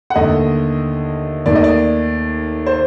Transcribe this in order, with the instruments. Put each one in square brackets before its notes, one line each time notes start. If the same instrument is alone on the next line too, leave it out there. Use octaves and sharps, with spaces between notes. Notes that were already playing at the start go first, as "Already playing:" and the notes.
[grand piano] F#5
D#2 D3 A3 D#5
D#2 D#3 A3 D5
D#5
D5
C5